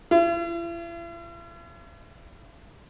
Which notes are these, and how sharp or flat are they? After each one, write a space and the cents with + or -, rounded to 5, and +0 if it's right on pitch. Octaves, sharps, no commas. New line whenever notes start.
E4 +45